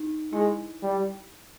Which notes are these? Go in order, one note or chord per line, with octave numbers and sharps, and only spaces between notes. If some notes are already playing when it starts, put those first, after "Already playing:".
Already playing: D#4
G#3 E4
G3